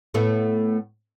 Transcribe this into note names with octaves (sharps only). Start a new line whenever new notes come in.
A2 A3 B3